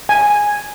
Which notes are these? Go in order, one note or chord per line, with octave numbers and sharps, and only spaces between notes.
G#5